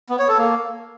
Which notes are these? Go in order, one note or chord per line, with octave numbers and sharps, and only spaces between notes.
B3
C#5
A4
A#3